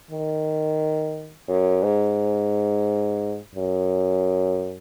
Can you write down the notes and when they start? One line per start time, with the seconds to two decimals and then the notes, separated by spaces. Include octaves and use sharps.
0.11 D#3
1.49 F#2
1.83 G#2
3.55 F#2